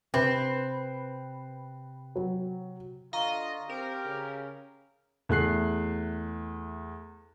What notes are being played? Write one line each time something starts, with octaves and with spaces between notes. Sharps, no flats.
C3 C4 B4
F#3
D3 F4 D#5 F5 A#5 C#6
C4 G4 A#4
C#3
E2 A3 F#6 C7